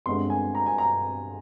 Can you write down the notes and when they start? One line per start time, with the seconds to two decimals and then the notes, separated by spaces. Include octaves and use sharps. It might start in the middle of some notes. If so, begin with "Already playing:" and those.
0.06 G1 G2 D3 G#3 C4 C6
0.30 G#5
0.55 A#5
0.66 G#5
0.78 A#5